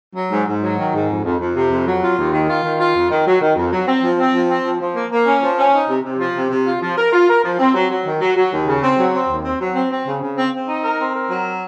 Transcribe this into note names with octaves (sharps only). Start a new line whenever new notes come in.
F#3
G#2
G#2
F#3
D#3
G#2
F2
F2
F2
C3
F2
F#3
F4
D#2
D#3
F4
D#3
F4
F2
D#3
F#3
D#3
F2
F#3
C4
F3
C4
F3
C4
F3
F3
A#3
A#3
C#4
F3
C#4
D#4
C3
C3
F3
C3
C3
F4
F3
A#4
F4
A#4
F3
C4
F#3
F#3
D#3
F#3
F#3
D#2
C#3
C4
F#3
C4
D#2
C4
F#3
C4
C4
C#3
C#3
C4
C4
D#4
A#4
C4
A#4
F#3